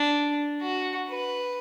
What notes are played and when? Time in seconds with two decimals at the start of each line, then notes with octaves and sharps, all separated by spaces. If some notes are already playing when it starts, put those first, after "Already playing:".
Already playing: D4
0.62 F#4
1.10 B4